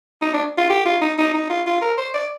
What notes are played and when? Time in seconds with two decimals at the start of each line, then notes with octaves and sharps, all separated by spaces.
0.22 D#4
0.34 D4
0.58 F4
0.70 G4
0.86 F4
1.02 D#4
1.18 D#4
1.34 D#4
1.50 F4
1.66 F4
1.82 A#4
1.98 C5
2.14 D5